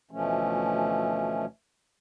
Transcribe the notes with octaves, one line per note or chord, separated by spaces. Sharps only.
D2 B2 E3 F3 A3 C#4